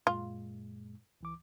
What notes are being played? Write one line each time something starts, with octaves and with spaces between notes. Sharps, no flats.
F#2 A#2 G#3 F4
C#2 E3 D6